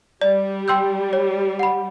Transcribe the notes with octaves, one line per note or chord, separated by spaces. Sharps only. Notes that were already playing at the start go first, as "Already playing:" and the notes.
G3 D5
G5 C6 E6 G6
C#5
F#5 B5